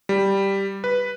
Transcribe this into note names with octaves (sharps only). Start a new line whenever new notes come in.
G3
B4